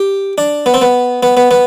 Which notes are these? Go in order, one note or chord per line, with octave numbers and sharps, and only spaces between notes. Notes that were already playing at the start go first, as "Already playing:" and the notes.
Already playing: G4
D4
B3
C4
B3
B3
B3
B3